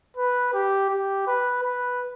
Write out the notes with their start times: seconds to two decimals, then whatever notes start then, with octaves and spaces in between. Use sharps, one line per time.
0.17 B4
0.54 G4
0.90 G4
1.27 B4
1.63 B4